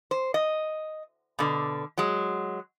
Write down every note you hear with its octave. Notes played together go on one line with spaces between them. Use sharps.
C5
D#5
B2 D3
F#3 G#3